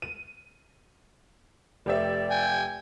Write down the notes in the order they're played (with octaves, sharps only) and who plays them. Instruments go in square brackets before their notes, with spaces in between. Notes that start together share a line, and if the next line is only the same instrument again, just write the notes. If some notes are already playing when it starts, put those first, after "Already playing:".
[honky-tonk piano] D#7
[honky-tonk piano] F1 G4 E5 [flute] D5
[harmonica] G5 G#5